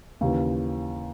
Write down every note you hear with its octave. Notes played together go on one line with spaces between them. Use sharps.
D#2 C#3 E3